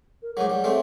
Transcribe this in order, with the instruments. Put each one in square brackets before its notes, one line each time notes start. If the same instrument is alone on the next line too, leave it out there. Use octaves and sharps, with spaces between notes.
[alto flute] A#4
[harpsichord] G#2 F#3 [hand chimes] G#4 C#5 D6 [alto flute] F#5
[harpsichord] G3 [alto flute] F#5
[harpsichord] G#3 A3 C4 [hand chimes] G#4 C#5 C6